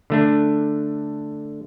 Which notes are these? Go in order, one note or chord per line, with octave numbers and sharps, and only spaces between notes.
D3 A3 D4